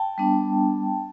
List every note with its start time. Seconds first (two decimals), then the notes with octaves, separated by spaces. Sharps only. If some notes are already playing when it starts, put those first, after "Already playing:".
Already playing: G5 A5
0.18 G3 B3 D4